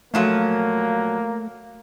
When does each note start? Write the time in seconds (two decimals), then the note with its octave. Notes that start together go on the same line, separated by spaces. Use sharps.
0.14 A#2 F3 F#3 A3 A#3